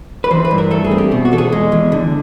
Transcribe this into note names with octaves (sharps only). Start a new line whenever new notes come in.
B4
E3 C5
B4
G2
A#4
A3 A4
G#4
C4
G4
B2
F#4
E2 A4
G#4
G#3
E2
D3